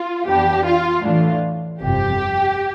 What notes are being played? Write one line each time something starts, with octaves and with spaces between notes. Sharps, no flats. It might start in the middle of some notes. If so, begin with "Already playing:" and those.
Already playing: F4
F2 E3 B3 D4 G4
F4
A2 E3 A3 D4 F4
G1 F2 C3 G4